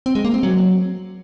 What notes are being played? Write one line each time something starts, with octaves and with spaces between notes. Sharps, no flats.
C4
G#3
A#3
C4
F#3